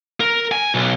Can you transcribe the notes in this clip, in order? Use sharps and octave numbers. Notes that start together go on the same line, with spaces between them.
A#4
G#5
B1